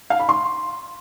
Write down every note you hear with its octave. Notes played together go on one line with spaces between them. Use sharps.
F5
B5
C6